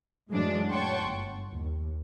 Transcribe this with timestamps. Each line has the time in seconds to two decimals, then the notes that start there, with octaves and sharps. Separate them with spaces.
0.30 F#2 A2 E3 F#3 G#3 D4
0.71 C#5 F#5 G5 A5 C6 C#6
1.03 G1
1.51 D#2